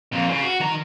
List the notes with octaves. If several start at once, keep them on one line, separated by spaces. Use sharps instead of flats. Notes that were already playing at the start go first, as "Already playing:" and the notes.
F2 A#2
C#3
F#4
D#3 A#5